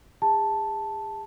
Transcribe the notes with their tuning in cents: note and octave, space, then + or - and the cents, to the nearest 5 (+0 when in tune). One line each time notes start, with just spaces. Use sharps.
G#4 -45 A5 +0